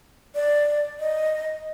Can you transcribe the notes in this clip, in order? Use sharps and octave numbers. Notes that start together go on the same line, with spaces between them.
D5
D#5